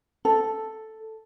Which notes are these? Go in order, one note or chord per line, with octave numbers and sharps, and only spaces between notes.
A4